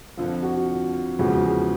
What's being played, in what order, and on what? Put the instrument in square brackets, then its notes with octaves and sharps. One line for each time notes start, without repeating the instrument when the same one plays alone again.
[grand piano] F2 D3 F3 [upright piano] F4
[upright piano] F#4
[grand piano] E2 C#3 F3 G#3 [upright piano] F#4
[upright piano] G#4